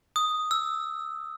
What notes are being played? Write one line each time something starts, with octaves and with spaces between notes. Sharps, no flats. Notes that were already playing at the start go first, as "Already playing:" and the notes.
D#6
E6